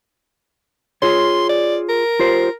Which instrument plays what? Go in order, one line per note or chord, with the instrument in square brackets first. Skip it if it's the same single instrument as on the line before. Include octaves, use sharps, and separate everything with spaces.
[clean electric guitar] F4 G#4 C#5 [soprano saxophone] C6
[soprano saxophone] D5
A#4
[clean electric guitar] F4 G4 C5